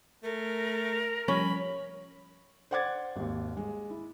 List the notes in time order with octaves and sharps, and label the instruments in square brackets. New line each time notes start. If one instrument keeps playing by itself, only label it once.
[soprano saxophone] A3 [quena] A#4
[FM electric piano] F3 G3 [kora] C#4 [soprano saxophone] B5
[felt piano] C5 D5 F#5 D6 G#6 A6
G#1 D#2
G#3
E4